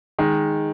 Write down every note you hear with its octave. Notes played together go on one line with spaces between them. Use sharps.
D#3 G#3